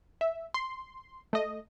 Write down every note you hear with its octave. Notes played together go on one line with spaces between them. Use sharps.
E5
C6
A3 D#5